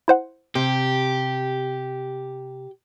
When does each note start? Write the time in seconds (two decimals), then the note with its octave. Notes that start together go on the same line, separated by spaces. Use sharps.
0.08 E4 C5 F#5
0.55 C3 G4